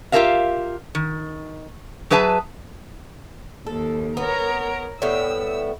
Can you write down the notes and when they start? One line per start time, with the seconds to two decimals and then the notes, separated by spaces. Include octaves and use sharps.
0.12 F4 G4 G#4 A#4 E5 F5
0.95 D#3
2.10 F#3 G#4 B4 E5 A5
3.66 D#2 A4
4.17 B3 A#4 C#5 A#5
5.02 A2 G3 B3 E6